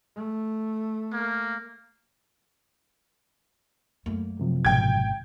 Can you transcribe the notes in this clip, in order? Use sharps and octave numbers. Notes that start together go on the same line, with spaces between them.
A3
A#3
F#2 A3 A#3
F#2 C3 F3
G#1 B2 G5 G#6